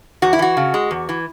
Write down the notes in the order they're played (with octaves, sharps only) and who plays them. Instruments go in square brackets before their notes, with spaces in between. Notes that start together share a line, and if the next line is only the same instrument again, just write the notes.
[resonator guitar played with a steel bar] E2 F#4
E4
E3 F#4
C#3
G#3
E2
E3